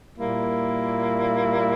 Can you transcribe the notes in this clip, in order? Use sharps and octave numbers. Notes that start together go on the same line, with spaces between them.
A#2 G3 A#3 E4